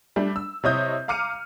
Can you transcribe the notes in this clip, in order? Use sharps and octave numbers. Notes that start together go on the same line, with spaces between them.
G3 A3 D4
E6
C3 E4 C#5 D#5 D#6 G6
F5 A#5 D6 F6 C#7 D#7